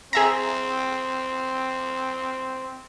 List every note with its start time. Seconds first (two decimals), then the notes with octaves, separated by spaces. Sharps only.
0.13 C4 G#4 E5 A#5